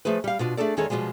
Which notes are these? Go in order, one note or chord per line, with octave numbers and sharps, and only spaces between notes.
F3 A3 G#4 B4
G3 F5
B2 D4 F4
A3 D4 G#4 A4 D5
E2 D#3 G#3 G#4 A4 C#5
B2 D3 F3 G3 G#3